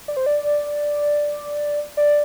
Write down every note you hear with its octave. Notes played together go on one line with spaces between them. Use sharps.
D5
C5
D5
D5